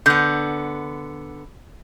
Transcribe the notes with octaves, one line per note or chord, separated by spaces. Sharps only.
D3 B3 G6